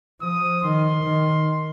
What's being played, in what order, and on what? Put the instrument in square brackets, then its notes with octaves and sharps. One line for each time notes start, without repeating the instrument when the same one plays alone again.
[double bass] F3 [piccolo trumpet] D#6
[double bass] D#3 [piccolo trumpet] C6
[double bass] D#3